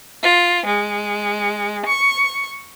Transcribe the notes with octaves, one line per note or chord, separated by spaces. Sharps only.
F4
G#3
C#6